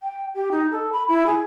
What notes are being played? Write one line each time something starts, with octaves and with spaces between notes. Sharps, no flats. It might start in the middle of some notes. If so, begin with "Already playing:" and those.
G5
G4
D#4
A4
B5
E4
G#4